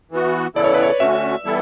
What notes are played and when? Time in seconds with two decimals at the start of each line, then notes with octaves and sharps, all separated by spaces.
0.11 E3 B3 F#4
0.55 C#3 E3 B3 E4 A4 D5
0.64 C#5
0.74 B4
0.83 C#5
1.00 D3 A3 C#4 F#4 E5
1.45 E3 G3 B3 E4 A4